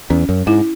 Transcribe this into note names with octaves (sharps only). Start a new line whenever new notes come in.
E2 C#4
F#2
G#2 E4